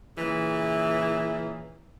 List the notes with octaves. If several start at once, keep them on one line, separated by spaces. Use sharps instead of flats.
A#2 C#3 E3